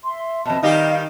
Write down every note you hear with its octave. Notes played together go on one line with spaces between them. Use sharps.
E5 C6
F2 B2 D#5 A5
D#3 G3 D#4 G4 F5